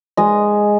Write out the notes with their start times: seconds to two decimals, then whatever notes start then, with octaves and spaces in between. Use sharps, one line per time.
0.17 G#3 D#5